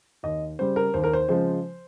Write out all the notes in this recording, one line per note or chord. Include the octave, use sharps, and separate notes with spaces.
D#2 D#5
C#3 G3 C5
A#4
D#2 C5
A#4
C5
C#3 F3 G#3 C5